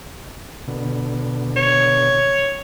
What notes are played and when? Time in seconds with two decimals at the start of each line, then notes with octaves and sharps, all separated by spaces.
0.68 B2 D3
1.57 C#5